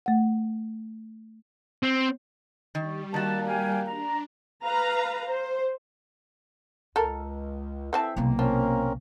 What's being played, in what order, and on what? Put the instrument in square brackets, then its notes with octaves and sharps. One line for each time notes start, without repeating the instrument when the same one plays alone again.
[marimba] A3 F#5
[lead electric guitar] C4
[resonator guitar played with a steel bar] D#3 [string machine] G3
[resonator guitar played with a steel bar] D#3 F#4 [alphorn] A#3 [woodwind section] A5
[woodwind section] F5 G5 G#5
[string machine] D4 [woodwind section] A#5
[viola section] B4 F5 A#5
C5
[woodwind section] C#2 [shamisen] A4 A#4
[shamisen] E3 C4 A5 [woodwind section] A4 E5
[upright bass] B1 C3 [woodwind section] A#3
[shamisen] F3 [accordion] C4 C#4 A#4